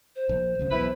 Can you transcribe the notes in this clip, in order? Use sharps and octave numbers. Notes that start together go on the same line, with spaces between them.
C5
A#1
F#1 D2 C#3
B1 E2 E4 B4